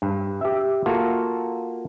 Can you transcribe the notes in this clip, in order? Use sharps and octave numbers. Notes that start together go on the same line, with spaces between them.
G2
G4 E5
A#3 F4 F#4 A4